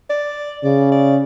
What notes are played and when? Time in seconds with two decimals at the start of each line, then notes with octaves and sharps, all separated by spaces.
0.10 D5
0.64 C#3 D5
0.92 D5